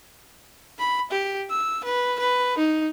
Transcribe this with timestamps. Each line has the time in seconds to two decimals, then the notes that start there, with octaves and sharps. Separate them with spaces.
0.79 B5
1.11 G4
1.50 E6
1.85 B4
2.20 B4
2.58 D#4